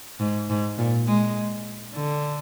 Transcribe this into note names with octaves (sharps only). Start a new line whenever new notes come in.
G#2
G#2
A#2
G#3
D3